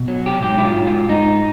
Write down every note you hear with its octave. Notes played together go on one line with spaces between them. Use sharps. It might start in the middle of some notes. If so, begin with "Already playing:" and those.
Already playing: B2
F#3
G4
G#2 G4
E4
F4
G#2
F4
G#2 D#4